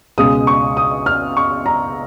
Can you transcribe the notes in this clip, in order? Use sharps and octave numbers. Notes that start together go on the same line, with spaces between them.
C#2 B2 G#3 D#6
C#6
D#6
F6
C#6
A#5